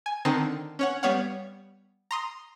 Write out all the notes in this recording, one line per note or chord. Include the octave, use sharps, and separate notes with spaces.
G#5
D3 D#3 C4 D#4 A5 A#5
C#4 C#5 F#5
G3 B3 C#5 F5 F#5
A#5 C6 D#6